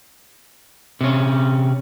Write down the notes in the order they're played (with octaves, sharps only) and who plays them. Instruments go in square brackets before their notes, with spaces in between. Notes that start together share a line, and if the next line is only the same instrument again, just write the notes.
[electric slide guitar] C3 C#4